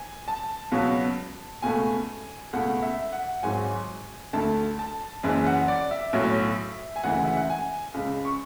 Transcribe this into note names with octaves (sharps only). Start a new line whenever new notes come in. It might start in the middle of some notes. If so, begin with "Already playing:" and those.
Already playing: G#5
A5
C#2 B2 F#3
C#2 B2 A3 G#5
C#2 B2 A3 F#5
E5
F#5
G#1 G#2 F#3 G#5
D2 D3 A3 A5
A5
F#1 F#2 E3 G#3
F#5
D5
E5
B1 A2 F#3
G#5
D2 C#3 E3 G#3 F#5
E5
F#5
G#5
C#2 C#3 G#3
C#6